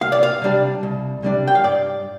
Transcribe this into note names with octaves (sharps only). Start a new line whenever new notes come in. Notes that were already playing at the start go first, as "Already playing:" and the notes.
C2 F5
D5
F5
C3 G3 D4
C2
C3 G3 D4
G5
F5
G2 D5